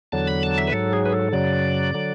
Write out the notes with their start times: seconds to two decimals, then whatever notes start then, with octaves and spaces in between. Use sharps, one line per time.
0.12 E2 D3 F#3 A5
0.27 B5
0.43 A5
0.58 E5
0.67 B4
0.72 G#2 F#3 A4
0.93 G#4
1.05 B4
1.13 A4
1.32 F#2 C#3 F#3 D5
1.94 D3 F#3